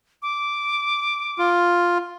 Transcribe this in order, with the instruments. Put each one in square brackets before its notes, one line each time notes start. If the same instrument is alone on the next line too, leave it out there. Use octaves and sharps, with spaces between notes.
[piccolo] D6
[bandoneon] F4